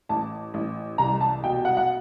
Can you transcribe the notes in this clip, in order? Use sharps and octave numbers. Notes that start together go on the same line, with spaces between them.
A1 A5
A1
C2 A#5
A5
B2 G5
F#5
F#5